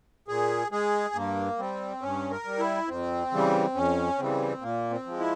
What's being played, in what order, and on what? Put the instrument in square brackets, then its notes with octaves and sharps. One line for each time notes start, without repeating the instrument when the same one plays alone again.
[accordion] A#2 G#4
G#3 G#4
G2 A#3
G3 C4
G2 C#4
A#4
G3
E4
F2 C4
C#3 E3 G3
F2 C#4
C#3 E3 G3 C4
A#2 A#3
C4
F3 G#3
E4